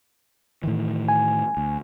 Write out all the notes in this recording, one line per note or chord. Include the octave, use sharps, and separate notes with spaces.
A2 D#3 E3
G#5
D2